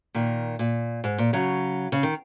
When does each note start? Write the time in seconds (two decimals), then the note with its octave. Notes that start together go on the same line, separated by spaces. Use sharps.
0.14 A#2 D#3
0.59 A#2
1.04 G#2
1.18 A#2
1.33 C#3 F#3
1.92 C#3
2.03 D#3